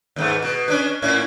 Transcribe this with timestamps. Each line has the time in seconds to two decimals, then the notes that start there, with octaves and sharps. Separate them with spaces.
0.16 D#2 G#2 A3
0.42 B2
0.68 C#4 D4 B4
1.02 A2 C#4 E4